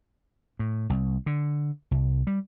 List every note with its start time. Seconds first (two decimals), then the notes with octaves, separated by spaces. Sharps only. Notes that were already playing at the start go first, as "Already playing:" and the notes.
0.59 A2
0.90 C2
1.26 D3
1.91 C2
2.27 G3